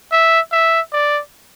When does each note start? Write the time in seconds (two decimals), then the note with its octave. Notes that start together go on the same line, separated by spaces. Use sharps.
0.12 E5
0.52 E5
0.92 D5